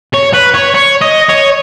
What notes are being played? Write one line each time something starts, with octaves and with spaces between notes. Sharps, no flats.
C#5
B4
C#5
C#5
D#5
C#5